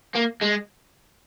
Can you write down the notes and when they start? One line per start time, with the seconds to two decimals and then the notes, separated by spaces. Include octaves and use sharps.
0.15 A#3
0.41 G#3